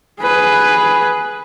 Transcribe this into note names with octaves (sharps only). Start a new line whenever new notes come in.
G#4 B4